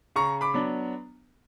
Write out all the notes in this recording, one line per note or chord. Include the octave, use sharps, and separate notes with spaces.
C#3 A#5 C#6
B5 D6
F#3 B3 D4